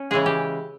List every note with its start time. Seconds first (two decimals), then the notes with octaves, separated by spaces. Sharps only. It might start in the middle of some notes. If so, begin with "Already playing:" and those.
Already playing: C#4
0.11 C#3 E3 G#3 G#4
0.26 G4